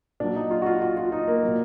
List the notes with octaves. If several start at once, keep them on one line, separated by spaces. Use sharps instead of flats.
A#2 F#3 D4
D#4
F4
F#4
F4
F#4
F4
D#4
A#3
A#2 F#3